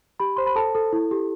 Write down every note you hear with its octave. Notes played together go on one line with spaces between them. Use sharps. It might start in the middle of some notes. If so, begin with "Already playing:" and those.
G4 B5
C5 C6
B5
A4 A5
A4
E4
G4